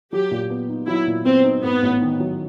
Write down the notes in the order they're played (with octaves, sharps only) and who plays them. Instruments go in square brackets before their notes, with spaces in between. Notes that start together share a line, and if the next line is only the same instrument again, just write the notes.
[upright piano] F#3 [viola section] G4
[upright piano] A#2
B3
D#4
[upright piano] F#3 [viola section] E4
[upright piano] A#2
[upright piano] B3 [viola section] C4
[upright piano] D#4
[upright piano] G#2 [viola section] B3
[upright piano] A1
D#3
F#3